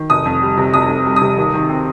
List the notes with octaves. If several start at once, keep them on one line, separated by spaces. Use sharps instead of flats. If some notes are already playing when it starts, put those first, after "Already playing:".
Already playing: D#3
F1 D#6
F2
G3
C3
F1 D#6
F2
G3
D#6
C3
D#2
D#3
C4